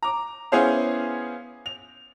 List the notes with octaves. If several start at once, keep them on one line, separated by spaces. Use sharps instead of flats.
A#5 D6
B3 C#4 E4 G#4 C5 F5
F7